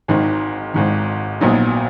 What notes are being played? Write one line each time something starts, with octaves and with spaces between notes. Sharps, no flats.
G#1 G#2 D#3
G#1 G#2 D#3
A#1 A#2 F#3 B3 D#4